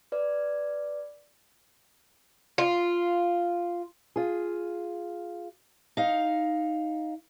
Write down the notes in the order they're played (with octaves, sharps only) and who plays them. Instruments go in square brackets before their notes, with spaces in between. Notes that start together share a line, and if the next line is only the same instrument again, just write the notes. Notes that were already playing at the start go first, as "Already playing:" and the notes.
[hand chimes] B4 D5
[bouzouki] F4
[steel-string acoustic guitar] F4 G#4
D#4 F5